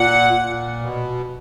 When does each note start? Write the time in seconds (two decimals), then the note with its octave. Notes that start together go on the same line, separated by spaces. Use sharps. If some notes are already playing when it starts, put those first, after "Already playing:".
Already playing: A#2 F#5
0.34 A#2
0.80 B2